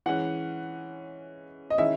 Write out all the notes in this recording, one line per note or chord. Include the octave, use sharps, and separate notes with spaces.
E3 G#3 C#4 F#5
D#5
D#3 G#3 C#4 E4 E5